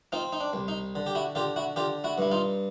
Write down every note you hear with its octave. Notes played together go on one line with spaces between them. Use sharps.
C4 D#4 F4
D#4
D4
C2
D#4
D3
G4
E4 F#4
D3 F4 G4
E4 F#4
D3 F4 G4
E4 F#4
G2 E4
D#4 F4